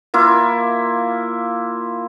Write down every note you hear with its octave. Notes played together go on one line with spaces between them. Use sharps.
A#3 E4 F4